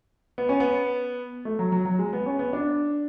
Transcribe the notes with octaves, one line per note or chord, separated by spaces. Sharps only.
B3
C#4
B3
A3
F#3
F#3
F#3
G#3
B3
C#4
B3
D4